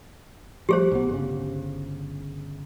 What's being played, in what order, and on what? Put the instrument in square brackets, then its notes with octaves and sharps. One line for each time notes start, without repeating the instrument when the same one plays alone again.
[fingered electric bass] F3 G3 A3 [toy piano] G4 G#4 C5
[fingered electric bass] B1 B3
G1 C#3